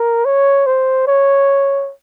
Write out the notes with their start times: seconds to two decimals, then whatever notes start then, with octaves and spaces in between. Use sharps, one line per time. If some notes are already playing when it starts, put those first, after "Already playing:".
Already playing: A#4
0.25 C#5
0.66 C5
1.07 C#5